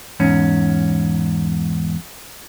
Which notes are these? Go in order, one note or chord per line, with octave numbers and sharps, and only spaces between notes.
E2 G#2 C#4